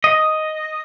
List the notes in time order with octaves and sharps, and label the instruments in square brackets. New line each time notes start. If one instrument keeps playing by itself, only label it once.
[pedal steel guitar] D#5